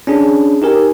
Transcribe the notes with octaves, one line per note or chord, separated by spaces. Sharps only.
C#4 D4 G#4
D#4 G4 A#4 G#5